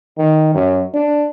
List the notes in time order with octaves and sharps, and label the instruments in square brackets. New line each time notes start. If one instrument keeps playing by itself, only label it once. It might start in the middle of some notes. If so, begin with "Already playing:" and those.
[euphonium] D#3
F#2
D4